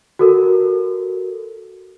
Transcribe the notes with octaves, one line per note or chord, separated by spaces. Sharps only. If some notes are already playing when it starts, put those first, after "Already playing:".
F#4 A4 A#4